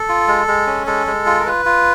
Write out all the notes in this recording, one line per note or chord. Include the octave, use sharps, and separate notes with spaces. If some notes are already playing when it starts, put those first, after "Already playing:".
Already playing: A4
F4
G#3
G#3
C#4
G#3 A4
G#3
F4
A#4
F4 B4
F4